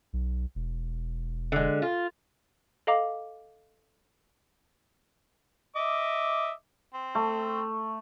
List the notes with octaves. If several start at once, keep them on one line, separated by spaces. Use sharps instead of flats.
B1
E1
D3 G#3
F4
A4 D#5 F5 A#5 D6
D#5 E5 D6
C4
A3